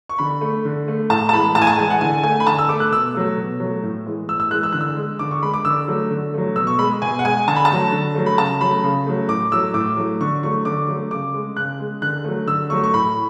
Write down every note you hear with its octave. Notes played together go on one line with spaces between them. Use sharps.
C#6
D3 B5
A3
D3
A3
A2 A5
A5
E3 G#3 B5
A2 A5
G#5
A5
E3 G#3 G#5
F#5
D3 G#5
A3 G#5
B5
D3 A5
E6
A3 D6
F#6
B2 E6
F#3 A3
B2
F#3 A3
A2
E3 G#3
A2 E6
E6
E3 G#3 F#6
E6
D3 F#6
E6
G#3
D3 D6
C#6
G#3 B5
D6
D3 E6
F#3 A3
D3
F#3 A3
B2 E6
C#6
G#3 B5
B2 G#5
F#5
G#3 G#5
D3 A5
B5
A5
F#3 A3
D3
F#3 A3
B5
C#3 A5
F#3 A3 B5
C#3
F#3 A3
A2 D6
F#3 A3 E6
A2 D6
F#3 A3
D3 C#6
F#3 A3 C#6
D3 D6
F#3 A3
C#3 D6
G#3
C#3 F#6
G#3
D3 F#6
F#3 A3
D3 E6
F#3 A3 C#6
C#6
A2 B5